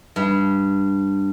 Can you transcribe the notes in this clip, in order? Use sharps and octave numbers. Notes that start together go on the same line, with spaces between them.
G2